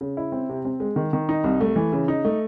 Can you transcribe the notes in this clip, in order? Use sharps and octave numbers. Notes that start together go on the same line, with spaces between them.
C#3
E4
C4
C3
C4
G#3
D#3
D#3
D#4
C2
A3
E3
C#3
D#4
A3